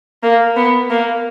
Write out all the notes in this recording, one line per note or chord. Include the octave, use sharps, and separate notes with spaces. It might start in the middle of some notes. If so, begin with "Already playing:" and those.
A#3
B3
A#3